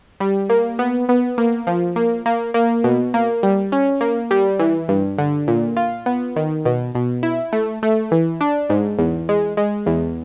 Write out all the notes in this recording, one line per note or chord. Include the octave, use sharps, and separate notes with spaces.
G3
A#3
B3
B3
A#3
F3
A#3
A#3
A#3
B2
A#3
G3
C#4
A#3
G3
E3
G2
D3
A#2
F4
B3
D#3
B2
B2
E4
A3
A3
E3
D4
G#2
E2
G#3
G#3
E2